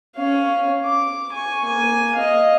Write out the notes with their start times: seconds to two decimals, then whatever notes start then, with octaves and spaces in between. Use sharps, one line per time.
0.16 C#4 F5
0.85 D6
1.32 G#5 C#6
1.64 A#3 G#5
2.15 D#5 F5